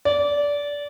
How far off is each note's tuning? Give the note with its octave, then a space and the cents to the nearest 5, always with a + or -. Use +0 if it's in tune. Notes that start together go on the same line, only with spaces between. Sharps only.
D5 -20